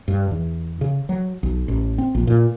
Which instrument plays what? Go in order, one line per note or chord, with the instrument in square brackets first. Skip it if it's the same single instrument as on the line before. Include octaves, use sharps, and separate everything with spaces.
[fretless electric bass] G2
E2
C#3
F#3
B1
A1
C4
A#1
A#2